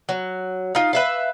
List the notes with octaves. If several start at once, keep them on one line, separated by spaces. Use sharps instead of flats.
F#3
D#4 F4
B4 E5 F5